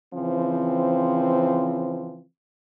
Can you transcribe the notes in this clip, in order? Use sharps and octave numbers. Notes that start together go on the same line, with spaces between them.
C#3 E3 F3 C4